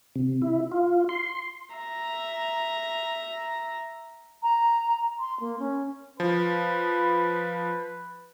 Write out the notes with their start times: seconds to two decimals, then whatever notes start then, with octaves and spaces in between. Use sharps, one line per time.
0.16 C3
0.42 E4
0.72 F4
1.09 C6
1.74 E5 A#5
4.43 A#5
5.19 C6
5.40 A#3
5.59 C#4
6.20 F3 B4